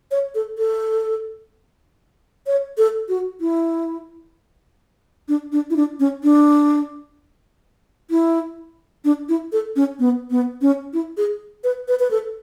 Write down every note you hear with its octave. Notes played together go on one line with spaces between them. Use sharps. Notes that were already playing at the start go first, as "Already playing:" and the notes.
C#5
A4
A4
C#5
A4
F#4
E4
D4
D4
E4
D4
C#4
D4
E4
D4
E4
A4
C#4
B3
B3
C#4
E4
G#4
B4
B4
B4
A4